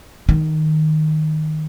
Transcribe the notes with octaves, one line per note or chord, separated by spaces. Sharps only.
D#3